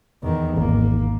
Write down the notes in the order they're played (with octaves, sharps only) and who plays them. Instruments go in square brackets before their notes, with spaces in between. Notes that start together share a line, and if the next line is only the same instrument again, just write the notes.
[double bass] E2 D#3
[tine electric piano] G#1 [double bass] A#3